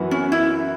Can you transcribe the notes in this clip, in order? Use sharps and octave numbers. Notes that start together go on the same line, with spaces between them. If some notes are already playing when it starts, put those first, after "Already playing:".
Already playing: F#2 E3 B3 F#4 B4
C#4
E4